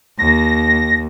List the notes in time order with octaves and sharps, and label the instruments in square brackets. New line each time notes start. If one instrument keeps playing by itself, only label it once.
[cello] D#2 [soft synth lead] A#6